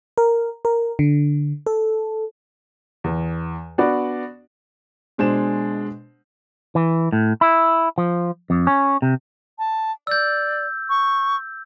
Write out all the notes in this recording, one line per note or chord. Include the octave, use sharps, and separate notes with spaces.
A#4
A#4
D3
A4
E2
B3 D4 F#4 D5
B2 G#3 D4 C5 E7
E3
A2
E4
F3
F2
C#4
C3
A5
D5 E6 G6
C#6